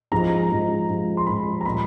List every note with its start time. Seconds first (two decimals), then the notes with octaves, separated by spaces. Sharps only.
0.12 G#2 F3 G#3 A#5
0.50 G#2 F3 G#3
0.88 G#2 F3 G#3
1.17 C6
1.27 G#2 F3 G#3 B5
1.61 A#5
1.65 A#2 G3 A#3 B5